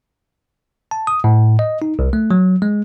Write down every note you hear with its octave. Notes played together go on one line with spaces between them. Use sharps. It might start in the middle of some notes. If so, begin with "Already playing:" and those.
A5
D#6
A2
D#5
D#4
C2
A3
F#3
G#3